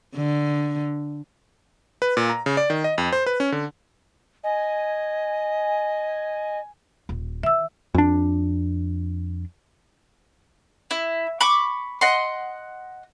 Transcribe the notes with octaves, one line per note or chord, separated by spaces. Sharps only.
D3
B4
A#2
A#5
C#3
D5
D#3
D#5
F2
C5
B4
C#4
D3
D#5 G#5
D#1
D#3 E5 E6
F2 D4
E4
B5 C#6 D6
D#5 F#5 C6